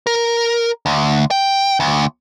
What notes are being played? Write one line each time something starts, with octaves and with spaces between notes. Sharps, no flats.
A#4
D2
G5
D2